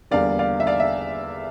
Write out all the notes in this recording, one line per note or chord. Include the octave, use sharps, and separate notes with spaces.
E2 D3 G3 A#3 D5 F5
D5 F5
E5
D5 F5
E5